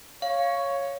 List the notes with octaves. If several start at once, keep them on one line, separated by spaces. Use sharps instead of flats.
C#5 F5